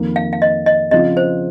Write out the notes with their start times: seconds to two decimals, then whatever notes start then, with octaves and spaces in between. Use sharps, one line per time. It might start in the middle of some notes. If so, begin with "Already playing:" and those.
Already playing: F2 D#3 A#3
0.16 F5
0.33 F5
0.42 D#5
0.66 D#5
0.91 C#3 F3 C4 F4 D#5
1.17 C5